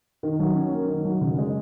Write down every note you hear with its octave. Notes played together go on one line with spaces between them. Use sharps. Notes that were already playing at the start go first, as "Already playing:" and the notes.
D#3
F#3
C#4
A#3
D#3
F#3
C#3
G#3